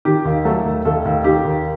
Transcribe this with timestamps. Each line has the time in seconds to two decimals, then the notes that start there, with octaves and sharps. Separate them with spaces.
0.05 D#3 G4
0.25 D#2
0.45 F#3 A3 A4
0.65 D#2
0.85 D#2 A3 A4
1.05 D#2
1.24 D#3 G4
1.45 D#2